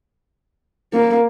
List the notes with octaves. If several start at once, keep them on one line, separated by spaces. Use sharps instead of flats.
A#3